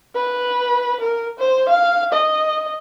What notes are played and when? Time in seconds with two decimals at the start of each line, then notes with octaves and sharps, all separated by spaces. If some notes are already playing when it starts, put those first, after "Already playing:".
0.15 B4
1.00 A#4
1.39 C5
1.69 F5
2.13 D#5